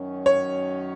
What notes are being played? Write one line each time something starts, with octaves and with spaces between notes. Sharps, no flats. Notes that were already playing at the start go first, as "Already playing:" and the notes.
Already playing: F#2 D#3 F#3 C#4
C#5